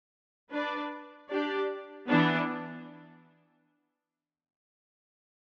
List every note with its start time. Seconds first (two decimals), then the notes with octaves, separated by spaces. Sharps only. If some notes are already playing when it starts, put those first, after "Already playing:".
0.51 D4 B4 D5
1.31 D4 G4 D5
2.10 E3 B3 D4